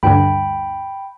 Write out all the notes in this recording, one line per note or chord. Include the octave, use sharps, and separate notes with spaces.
D2 G2 D3 G5 B5